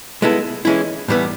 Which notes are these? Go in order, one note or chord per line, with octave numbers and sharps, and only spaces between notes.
G#3 B3 E4 A4
E3 G#3 C#4 E4
A2 E3 G3 B3